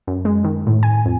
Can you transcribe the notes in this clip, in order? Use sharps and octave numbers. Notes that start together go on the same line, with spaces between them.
F#2
G#3
D#3
A2
G#5
F2